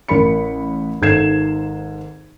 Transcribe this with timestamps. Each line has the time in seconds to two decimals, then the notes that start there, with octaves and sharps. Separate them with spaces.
0.08 A1 A#4 B5 C#7
1.01 G#1 G#2 A4 G#6 C7 E7